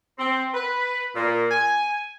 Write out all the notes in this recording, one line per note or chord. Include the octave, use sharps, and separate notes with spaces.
C4
B4
A#2
G#5